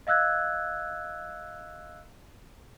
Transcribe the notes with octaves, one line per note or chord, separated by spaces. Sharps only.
D#5 F5 E6 F#6 G#6